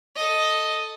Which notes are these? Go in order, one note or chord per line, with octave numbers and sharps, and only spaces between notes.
A4 D#5